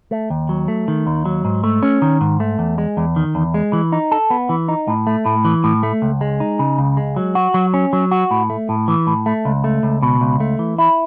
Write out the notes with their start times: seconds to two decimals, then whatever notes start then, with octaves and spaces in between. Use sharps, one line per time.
0.11 A3
0.30 D#2
0.49 F#3
0.68 A3
0.88 D#3
1.06 D#2
1.26 F#3
1.45 G#2
1.64 A3
1.83 C#4
2.02 D#3
2.21 G#2
2.40 A3
2.59 E2
2.78 G#3
2.97 E2
3.16 D#3
3.35 E2
3.54 G#3
3.73 E3
3.92 D#4
4.12 A4
4.30 B3
4.49 E3
4.68 D#4
4.88 A2
5.07 A3
5.26 A2
5.45 E3
5.64 A2
5.83 A3
6.02 C#2
6.21 G#3
6.40 D#4
6.59 C#3
6.78 C#2
6.97 G#3
7.16 F#3
7.35 F#4
7.54 F#3
7.74 C#4
7.93 F#3
8.11 F#4
8.31 A2
8.50 A3
8.69 A2
8.88 E3
9.07 A2
9.26 A3
9.45 C#2
9.64 A3
9.83 C#2
10.02 B2
10.21 C#2
10.40 A3
10.59 E3
10.78 E4